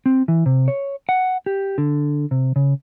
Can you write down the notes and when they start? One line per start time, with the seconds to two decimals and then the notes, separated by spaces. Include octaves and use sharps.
0.06 C4
0.28 E3
0.46 C3
0.68 C#5
1.09 F#5
1.46 G4
1.78 D3
2.31 C3
2.56 C#3